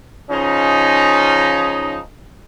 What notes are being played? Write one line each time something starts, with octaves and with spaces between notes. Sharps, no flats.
C#3 F3 C#4 D#4